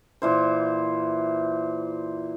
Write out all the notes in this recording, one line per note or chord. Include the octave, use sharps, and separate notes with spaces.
A#2 E3 C5